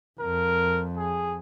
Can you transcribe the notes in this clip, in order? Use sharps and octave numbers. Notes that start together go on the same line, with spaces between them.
F2 A#4
G#4